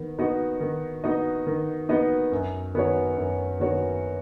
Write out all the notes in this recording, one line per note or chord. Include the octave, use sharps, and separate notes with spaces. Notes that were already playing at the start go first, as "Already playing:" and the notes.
Already playing: D#3 B3
B3 D#4 F#4 D#5
D#3
B3 D#4 F#4 D#5
D#3
B3 D#4 F#4 D#5
F#2
D#3 B3 F#4 C#5
F#2
D#3 B3 F#4 C#5